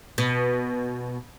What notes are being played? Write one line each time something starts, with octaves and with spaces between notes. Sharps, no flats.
B2